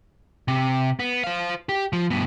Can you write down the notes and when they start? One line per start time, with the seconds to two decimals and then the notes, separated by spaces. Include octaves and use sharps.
0.48 C3
0.99 B3
1.24 C5 F5
1.69 G4
1.93 F3
2.10 G2 B2